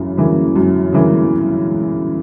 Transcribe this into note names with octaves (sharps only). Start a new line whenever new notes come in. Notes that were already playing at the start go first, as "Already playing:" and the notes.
Already playing: F#2 C#3 E3
C#3 E3 A#3
F#2
C#3 E3 A#3